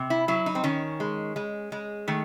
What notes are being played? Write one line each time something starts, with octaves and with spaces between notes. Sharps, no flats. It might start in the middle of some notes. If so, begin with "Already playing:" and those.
Already playing: C3
E4
F#3 E4
D#4
C4
D#3 C#4
G#3
G#3
G#3
D#3 A3